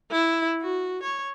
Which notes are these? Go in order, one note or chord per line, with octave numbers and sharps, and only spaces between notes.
E4
F#4
C#5